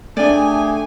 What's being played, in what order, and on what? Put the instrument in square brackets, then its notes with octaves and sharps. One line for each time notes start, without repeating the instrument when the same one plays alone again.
[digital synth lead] A3 [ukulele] D4 D5 [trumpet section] G4 G#4 [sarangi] G#5